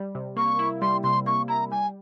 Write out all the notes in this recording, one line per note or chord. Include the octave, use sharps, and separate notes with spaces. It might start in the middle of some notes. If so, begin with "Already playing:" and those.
Already playing: G3
C3
A#3 C#6
E4
G3 C6
C3 C6
A#3 C#6
E4 A#5
G3 G#5